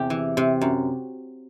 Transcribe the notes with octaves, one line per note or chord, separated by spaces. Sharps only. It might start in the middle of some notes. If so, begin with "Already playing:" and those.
Already playing: E2 C3 G4
E3
C3
F#2